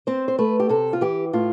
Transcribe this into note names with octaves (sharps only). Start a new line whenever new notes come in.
C4 C5
C5
A3 B4
G4
C3 A4
F4
E3 G4
A2 F4